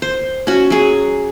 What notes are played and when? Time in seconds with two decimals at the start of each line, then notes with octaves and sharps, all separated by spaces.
0.02 C5
0.47 C#4 F#4
0.70 F#3 G#4